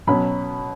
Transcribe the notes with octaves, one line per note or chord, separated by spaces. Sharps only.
B2 F#3 C#4 B5